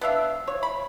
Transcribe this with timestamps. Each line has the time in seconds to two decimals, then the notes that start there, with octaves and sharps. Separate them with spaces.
0.01 B3 D4 E5 F5
0.48 C#5
0.63 B5